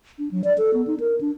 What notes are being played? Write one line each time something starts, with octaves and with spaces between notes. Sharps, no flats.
D4
F#3
D5
A4
B3
D#4
A#4
D4